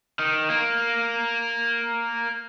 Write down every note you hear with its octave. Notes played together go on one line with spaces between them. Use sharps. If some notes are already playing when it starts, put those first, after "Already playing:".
D#3
A#3